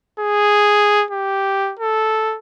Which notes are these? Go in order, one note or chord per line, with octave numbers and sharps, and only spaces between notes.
G#4
G4
A4